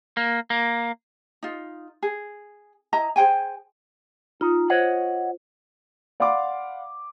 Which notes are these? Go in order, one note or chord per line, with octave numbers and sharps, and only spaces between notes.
A#3
A#3
D#4 F4
G#4
E4 D#5 A#5
G#4 C5 G5 G#5
D#4 F4
C5 C#5 D#5 F#5
D5 F5 F#5 B5 C6 D6